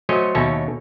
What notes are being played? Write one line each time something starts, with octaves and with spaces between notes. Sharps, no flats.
F#3 A3 C#4 C5 C#5 D#5
D#2 B2 C#4 A4 C#5 E5